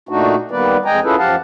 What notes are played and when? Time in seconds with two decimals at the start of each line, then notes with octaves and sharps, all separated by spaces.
0.09 A#2 A3 D4 D#4 F#4
0.51 D#3 G3 A#3 B3 B4 D5
0.86 F2 G#3 D#5 G5 G#5 A#5
1.04 C#4 E4 F4 G#4 A4 B4
1.18 F#2 F3 G4 F5 F#5 A5